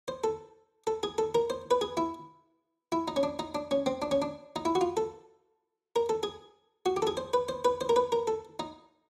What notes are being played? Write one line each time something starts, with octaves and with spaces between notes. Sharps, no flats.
C5
A4
A4
G#4
A4
A#4
C5
B4
G#4
E4
E4
D#4
C#4
D4
D#4
D4
C#4
C4
D4
C#4
D4
D#4
E4
F#4
F4
A4
A#4
A4
G#4
F#4
G4
A4
G#4
C5
B4
C5
B4
C5
A#4
B4
A#4
A4
D#4